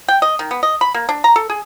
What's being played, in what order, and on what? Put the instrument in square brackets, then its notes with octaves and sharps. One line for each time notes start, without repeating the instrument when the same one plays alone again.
[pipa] G5
D#5
D#3
B3
D#5
B5
A#3
D4
A#5
A4
G#4